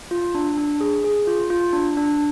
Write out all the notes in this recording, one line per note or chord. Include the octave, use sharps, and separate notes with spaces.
F4
D4
D4
G#4
G#4
F4
F4
D4
D4